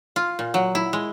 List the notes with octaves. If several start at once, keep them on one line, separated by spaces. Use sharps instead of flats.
F4
A#2
F#3
E4
G#3